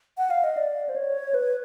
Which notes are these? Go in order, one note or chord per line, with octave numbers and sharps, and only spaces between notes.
F#5
F5
D#5
D5
C5
C#5
B4